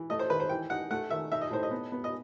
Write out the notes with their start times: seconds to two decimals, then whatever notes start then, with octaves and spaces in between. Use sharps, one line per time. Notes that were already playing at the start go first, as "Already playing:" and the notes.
Already playing: E3
0.10 A3 D#5
0.19 C5
0.29 D#3 B4
0.40 C5
0.49 E3 G5
0.70 D#4 F#5
0.91 A3 F#5
1.10 D#3 E5
1.32 D#4 E5
1.41 D#5
1.51 A2 C5
1.63 D#5
1.71 B3
1.92 B3
2.04 D#5